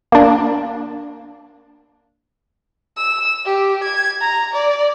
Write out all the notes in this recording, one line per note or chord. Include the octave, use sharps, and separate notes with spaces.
A#3 D4
E6
G4
G#6
A#5
D5